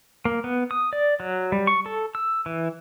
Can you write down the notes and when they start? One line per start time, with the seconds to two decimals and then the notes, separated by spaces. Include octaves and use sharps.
0.25 A#3
0.44 B3
0.71 D#6
0.93 D5
1.20 F#3
1.52 G3
1.67 C#6
1.86 A4
2.15 E6
2.46 E3